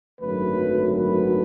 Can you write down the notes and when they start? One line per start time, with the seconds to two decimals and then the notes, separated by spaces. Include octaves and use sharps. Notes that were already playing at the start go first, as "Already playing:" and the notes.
0.21 G#1 F#2 D3 F#3 A3 B4
0.92 B4